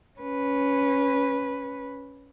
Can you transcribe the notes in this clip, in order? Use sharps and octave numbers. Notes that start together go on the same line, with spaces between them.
C#4 B4